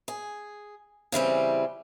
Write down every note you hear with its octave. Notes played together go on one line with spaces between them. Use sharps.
G#4
C#3 E3 G3 C4